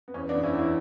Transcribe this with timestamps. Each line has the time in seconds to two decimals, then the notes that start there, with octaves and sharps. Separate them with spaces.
0.08 B3
0.14 E2 C#4
0.29 B3 D4
0.35 E2
0.43 C#4 E4
0.53 E2
0.58 C#4 E4